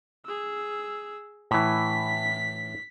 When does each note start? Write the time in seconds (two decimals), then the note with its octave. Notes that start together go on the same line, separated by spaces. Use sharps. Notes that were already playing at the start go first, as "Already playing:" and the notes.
0.25 G#4 E6
1.51 A2 E3 B6